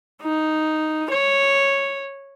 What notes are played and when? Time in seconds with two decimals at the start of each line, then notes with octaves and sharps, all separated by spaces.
0.22 D#4
1.11 C#5